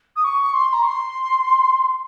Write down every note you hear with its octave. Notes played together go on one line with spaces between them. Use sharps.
D#6
C#6
C6
A#5
C#6
C6